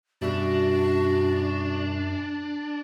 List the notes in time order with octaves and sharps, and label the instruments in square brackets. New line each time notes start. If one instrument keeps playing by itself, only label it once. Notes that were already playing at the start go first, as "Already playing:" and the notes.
[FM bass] F#2 [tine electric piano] B2 G3 E5 [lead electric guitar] D4 [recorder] F#4